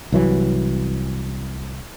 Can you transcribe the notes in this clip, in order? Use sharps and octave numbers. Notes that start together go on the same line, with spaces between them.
C2 E3 F#3